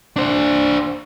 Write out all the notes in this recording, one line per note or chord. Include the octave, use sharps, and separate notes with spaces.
D4 C5